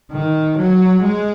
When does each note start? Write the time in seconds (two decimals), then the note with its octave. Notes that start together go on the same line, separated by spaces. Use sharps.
0.12 D#3
0.58 F#3
1.04 G#3